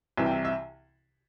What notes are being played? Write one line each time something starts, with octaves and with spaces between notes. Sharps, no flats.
C2 C3 E3 E5
G5
E5
E5